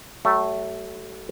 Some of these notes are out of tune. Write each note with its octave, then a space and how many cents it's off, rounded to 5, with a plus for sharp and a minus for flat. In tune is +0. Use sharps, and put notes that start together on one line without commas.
F#3 +40 A3 +0